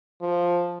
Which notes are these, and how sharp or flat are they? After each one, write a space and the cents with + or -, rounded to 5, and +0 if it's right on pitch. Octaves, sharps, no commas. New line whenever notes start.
F3 +5